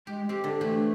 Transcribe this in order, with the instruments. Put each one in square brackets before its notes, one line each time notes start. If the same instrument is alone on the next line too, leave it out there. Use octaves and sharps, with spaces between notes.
[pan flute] G#3 [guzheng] G4
[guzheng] C4 [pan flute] G4
[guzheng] D3
[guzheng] E3 G4 [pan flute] A3